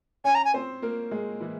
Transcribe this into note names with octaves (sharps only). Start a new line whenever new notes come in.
C#4 C#5 G#5
A#5
G#5
C4 C5
A#3 A#4
G#3 G#4
E3 E4